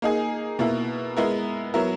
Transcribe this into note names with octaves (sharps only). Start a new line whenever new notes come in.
A#3 D#4 G#4
B2 A#3 E4
G#3 B3 E4 A#4
F#3 B3 E4 A#4